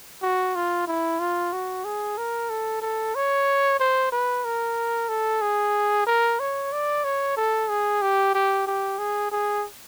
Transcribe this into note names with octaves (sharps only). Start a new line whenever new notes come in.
F#4
F4
E4
F4
F#4
G#4
A#4
A4
A4
C#5
C5
B4
A#4
A4
G#4
A#4
C#5
D5
C#5
A4
G#4
G4
G4
G4
G#4
G#4